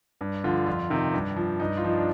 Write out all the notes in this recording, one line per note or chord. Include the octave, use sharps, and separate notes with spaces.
G2
D3 F3 F4
F2 F4
C3 D#3
G2
F3
G2 D#4
F4
F3 D#4
D4